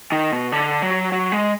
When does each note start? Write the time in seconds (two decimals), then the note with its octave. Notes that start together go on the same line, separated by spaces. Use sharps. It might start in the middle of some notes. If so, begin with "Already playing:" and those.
0.12 D#3
0.32 B2
0.52 D3
0.82 F#3
1.12 F#3
1.32 G#3